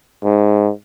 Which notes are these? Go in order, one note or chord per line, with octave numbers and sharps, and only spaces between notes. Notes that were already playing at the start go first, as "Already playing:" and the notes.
G#2